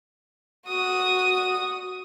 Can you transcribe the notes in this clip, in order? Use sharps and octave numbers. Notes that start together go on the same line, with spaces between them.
F#4 D#6